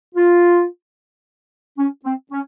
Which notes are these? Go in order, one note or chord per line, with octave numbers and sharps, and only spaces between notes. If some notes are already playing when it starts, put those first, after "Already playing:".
F4
C#4
C4
C#4